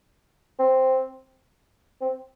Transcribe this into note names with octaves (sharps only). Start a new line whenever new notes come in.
C4
C4